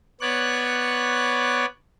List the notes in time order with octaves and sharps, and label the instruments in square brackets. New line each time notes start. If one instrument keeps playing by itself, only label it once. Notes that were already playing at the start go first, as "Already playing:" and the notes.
[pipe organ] B3 C#5 D5 F#6